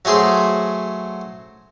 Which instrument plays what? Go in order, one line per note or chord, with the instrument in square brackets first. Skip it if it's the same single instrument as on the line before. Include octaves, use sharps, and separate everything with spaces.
[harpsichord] F#3 A3 G#4 C5